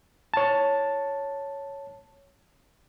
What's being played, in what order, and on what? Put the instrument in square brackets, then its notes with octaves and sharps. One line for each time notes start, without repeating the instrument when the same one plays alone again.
[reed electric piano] C#5 A5